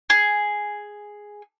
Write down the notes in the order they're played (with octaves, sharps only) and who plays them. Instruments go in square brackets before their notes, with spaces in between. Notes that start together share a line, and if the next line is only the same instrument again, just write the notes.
[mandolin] G#4